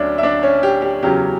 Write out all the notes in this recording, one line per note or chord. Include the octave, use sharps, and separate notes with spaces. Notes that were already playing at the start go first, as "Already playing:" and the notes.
Already playing: D2 D3 F#3 C#4 D4 D5 E5
E5
D4 D5
C#4 C#5
G4
G4
E2 C#3 F#3 C#4 G4